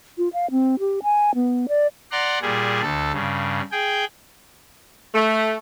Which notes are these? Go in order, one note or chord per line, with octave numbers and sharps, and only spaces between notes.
F4
F5
C4
G4
G#5
B3
D5
D5 F#5 A#5 C6
A#2 G3 G#4
D2 A4
G2 C#3
G#4 G5
A3